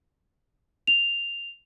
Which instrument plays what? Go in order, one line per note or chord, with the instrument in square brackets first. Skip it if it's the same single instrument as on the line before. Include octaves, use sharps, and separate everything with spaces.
[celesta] F7